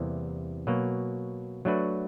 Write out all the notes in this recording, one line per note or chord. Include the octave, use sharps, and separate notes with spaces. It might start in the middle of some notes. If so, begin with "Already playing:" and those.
Already playing: E2 C3 E3 G3 A#3
B2 F#3 A#3
F#3 A3 D4 F#4 B4